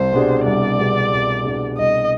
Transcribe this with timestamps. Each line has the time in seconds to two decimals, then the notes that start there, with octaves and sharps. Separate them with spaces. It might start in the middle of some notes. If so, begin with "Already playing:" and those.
Already playing: C2 C5
0.13 B2 G3 D4 G#4
0.46 C2 D5
0.78 B2 G3 D4 G#4
1.12 C2
1.44 B2 G3 D4 G#4
1.77 C2 D#5